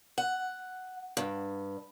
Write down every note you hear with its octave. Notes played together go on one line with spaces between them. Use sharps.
F#5
G2